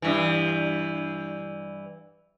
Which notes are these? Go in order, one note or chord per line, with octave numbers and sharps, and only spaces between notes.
G2 E3